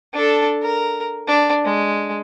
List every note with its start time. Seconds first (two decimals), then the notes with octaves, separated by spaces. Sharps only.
0.14 D4 A4
0.62 A#4
1.28 D4
1.65 G#3